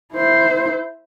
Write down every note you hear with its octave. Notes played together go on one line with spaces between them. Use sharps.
E4 C5